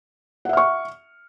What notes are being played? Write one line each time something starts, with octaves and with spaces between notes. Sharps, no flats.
E5 F#5 C#6 F6